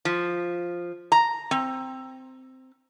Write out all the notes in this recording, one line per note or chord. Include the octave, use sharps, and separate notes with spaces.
F3
A#5
C4